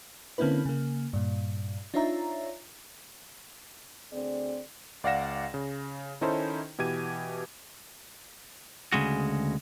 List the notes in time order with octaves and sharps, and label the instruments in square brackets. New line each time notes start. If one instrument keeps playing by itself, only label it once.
[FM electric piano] D3 A#3 C4 C#4 E4 B4
C#3 A#3
G2 A#2
D4 D#4 F4 C#5 E5 A#5
[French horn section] D2 C4 G#4 D5
[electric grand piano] C#2 D5 F5 F#5 A#6 E7
C#3
D#3 C#4 D#4 E4 A4 C5
B2 E3 G4 G#6 D#7
[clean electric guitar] D2 C#3 G#3 F#4